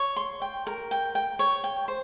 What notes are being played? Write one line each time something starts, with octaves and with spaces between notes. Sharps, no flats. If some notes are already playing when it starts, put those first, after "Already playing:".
Already playing: C#5
C6
G5
A#4
G5
G5
C#5
G5
C5